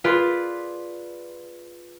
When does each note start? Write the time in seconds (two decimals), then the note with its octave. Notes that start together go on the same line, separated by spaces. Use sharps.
0.04 F4 G#4 B4 D5